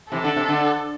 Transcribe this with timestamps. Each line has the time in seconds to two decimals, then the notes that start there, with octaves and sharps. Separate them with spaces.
0.11 C3 E3 A4
0.24 D3
0.36 C3
0.49 D3